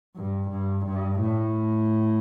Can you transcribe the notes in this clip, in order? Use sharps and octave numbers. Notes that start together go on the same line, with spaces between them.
G2
G2
G2
A2